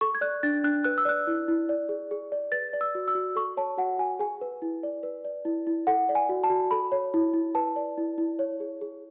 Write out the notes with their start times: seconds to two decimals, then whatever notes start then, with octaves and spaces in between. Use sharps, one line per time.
0.01 A4 C#6
0.15 G#6
0.21 D5 F#6
0.43 D4 A6
0.64 D4 F#6
0.84 B4 F#6
0.98 E6
1.05 D5 F#6
1.27 E4
1.48 E4
1.69 D5
1.89 G#4
2.11 G#4
2.32 D5
2.52 B4 A6
2.73 D5
2.81 E6
2.95 F#4
3.08 E6
3.15 F#4
3.36 A4 C#6
3.57 C#5 A5
3.78 F#4 F#5
3.98 F#4 G#5
4.19 G#4 G#5
4.41 B4
4.62 E4
4.83 D5
5.03 B4
5.25 D5
5.45 E4
5.67 E4
5.87 A4 F#5
6.09 D5
6.15 G#5
6.29 F#4
6.44 A5
6.50 F#4
6.71 A4 B5
6.92 C#5
7.14 E4
7.34 E4
7.55 B4 A5
7.76 D5
7.97 E4
8.18 E4
8.39 C#5
8.60 G#4
8.81 G#4